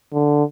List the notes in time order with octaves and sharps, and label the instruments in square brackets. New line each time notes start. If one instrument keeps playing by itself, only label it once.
[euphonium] D3